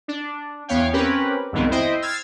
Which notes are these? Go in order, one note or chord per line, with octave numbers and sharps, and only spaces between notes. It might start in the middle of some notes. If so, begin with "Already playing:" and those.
D4
E2 B3 C#5 F5 G5
C4 C#4 G4 A#4 B4
C2 F2 G#2 D#3 B3 C4
E4 C5 D#5 G5
E6 F6 G#6 A6 C7